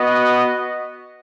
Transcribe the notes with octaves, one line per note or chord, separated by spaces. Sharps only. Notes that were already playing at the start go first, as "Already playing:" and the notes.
Already playing: B3 F#4 D#5